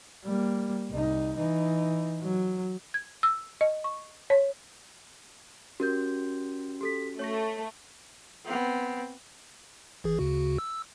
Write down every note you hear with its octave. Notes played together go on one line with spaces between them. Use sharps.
G3 A#3
C2 D#4
E3 D#4
F#3
G#6
E6
D#5
C#6
C#5
C#4 F#4 G4 A#4 G6
G4 A4 B6
A3 C#5 C#6 A#6
B3 C4
G#1 E3 G#4
D2 C#3 F#4
E6